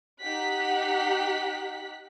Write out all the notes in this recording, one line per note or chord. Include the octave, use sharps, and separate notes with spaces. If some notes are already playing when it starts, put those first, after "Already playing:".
D#4 G4 F#5 F#6 B6